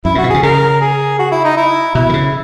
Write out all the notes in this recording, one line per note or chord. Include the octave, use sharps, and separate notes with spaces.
F#2 E4
A#2
F#4
B2
C#3 G#4
C#3 A#4
G#4
F#4
E4
D#4
E4
B2 E4
D#3
C#3